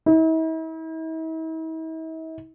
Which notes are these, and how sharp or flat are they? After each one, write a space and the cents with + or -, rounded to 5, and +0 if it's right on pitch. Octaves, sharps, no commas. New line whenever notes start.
E4 -45